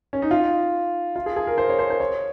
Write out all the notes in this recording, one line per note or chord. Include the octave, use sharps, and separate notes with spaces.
C#4
D#4
F4
F4
G#4
G#4
A#4
C5
C#5
C5
C5
C#5